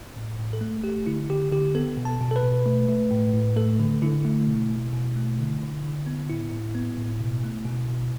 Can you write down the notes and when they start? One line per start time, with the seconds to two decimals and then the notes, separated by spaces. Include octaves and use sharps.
0.16 A2
0.39 A2
0.53 A4
0.61 A3
0.84 A3 G4
1.06 D3 E4
1.29 D3 G4
1.52 D3 G4
1.75 B3 A4
1.97 B2
2.05 A5
2.21 B2
2.31 A4
2.36 B4
2.43 B2
2.66 A3
2.89 A3
3.11 A2
3.34 A2
3.56 A3 A4
3.79 D3
4.02 D3 E4
4.25 A3
4.48 B2
4.70 B2
4.93 B2
5.16 A3
5.39 D3
5.61 D3
5.84 D3
6.06 B3
6.30 A2 E4
6.52 A2
6.75 B3
6.98 A2
7.20 B2
7.43 A3
7.65 B2
7.88 B2